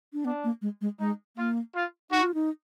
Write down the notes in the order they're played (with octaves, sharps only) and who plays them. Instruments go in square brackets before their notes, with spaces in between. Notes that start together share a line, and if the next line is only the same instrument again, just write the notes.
[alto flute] D4
[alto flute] B3 [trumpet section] D4
[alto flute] A#3
G#3
G#3
[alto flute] G#3 [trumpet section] D#4
[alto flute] A#3 [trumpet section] F4
[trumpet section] F4
[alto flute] D#4 [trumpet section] F#4
[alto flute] F4
D#4